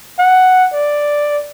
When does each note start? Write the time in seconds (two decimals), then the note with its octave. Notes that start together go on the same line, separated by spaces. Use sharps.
0.18 F#5
0.73 D5